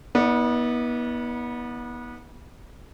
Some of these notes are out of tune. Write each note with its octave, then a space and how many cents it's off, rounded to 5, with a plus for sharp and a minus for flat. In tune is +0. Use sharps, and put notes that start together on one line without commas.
B3 -30 D#4 +45 D5 -5